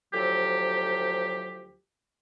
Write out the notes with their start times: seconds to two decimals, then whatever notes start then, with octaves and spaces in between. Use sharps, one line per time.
0.14 D2 F3 F#3 G4